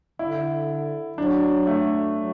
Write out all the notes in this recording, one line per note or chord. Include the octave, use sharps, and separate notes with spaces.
D3 E4
F#3 D4
A3
F#3